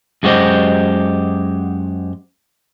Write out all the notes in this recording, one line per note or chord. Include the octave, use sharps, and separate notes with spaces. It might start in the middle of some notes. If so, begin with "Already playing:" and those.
F#2 G#3 F#4 G4 C5 D#5